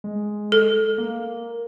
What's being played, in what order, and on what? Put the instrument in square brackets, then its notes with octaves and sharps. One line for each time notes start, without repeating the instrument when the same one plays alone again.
[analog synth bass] G#3
[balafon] A4
[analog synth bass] A#3